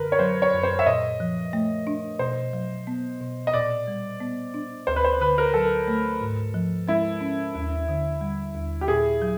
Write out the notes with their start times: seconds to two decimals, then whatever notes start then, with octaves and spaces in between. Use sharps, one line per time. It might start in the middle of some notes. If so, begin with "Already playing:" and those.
Already playing: F#2 D3 A#4 B4
0.12 C#5
0.19 F#3 C5
0.42 C#5
0.53 F#2
0.63 C5
0.79 E5
0.86 A#2 D#5
1.20 F3
1.53 A3
1.87 D4
2.19 B2 C5
2.53 F#3
2.87 B3
3.21 B2
3.47 D#5
3.53 A#2 D5
3.87 G3
4.20 B3
4.54 D4
4.87 D2 C5
4.96 B4
5.04 C5
5.20 D3 B4
5.38 A#4
5.54 F#3 A4
5.88 A3
6.21 G#2
6.54 F3
6.88 G#3 E4
7.21 C#4
7.55 D#2
7.89 D3
8.21 G3
8.54 D#2
8.81 G4
8.88 A#2 G#4
9.22 F#3